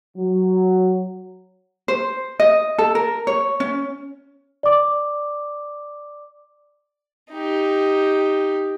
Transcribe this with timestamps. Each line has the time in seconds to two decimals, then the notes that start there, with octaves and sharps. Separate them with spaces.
0.17 F#3
1.88 C5
2.40 D#5
2.78 A4
2.95 A#4
3.27 C#5
3.60 C#4
4.63 D5 D6
7.32 D#4 G4